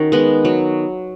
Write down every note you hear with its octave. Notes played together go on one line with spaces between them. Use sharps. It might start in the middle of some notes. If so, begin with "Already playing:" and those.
Already playing: D#3 C#4 F#4
G#3 B3
F#3